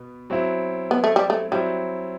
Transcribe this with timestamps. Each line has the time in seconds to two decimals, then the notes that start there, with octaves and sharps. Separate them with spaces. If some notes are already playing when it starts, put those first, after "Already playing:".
Already playing: B2 B3
0.30 F#3 C4 E4
0.91 B3
1.04 A3
1.16 G3
1.30 A3
1.51 F#3 G3 C4 E4